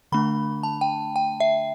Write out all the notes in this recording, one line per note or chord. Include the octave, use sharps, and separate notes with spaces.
D3 A3 D4 B5
A5
G5
G5
E5